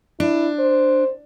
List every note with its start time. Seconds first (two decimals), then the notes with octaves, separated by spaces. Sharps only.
0.20 D4 E4
0.59 C5